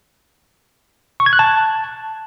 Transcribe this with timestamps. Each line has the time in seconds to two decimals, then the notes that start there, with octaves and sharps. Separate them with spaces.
1.20 C#6
1.26 G#6
1.33 F#6
1.39 A5